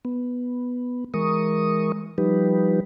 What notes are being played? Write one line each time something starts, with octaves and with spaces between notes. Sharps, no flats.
B3
E3 G#3 A#4 C#6 D#6
F3 G3 D#4 G4 B4